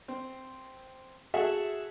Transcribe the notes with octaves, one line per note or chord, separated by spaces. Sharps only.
C4
F#4 G#4 A4 E5 F#5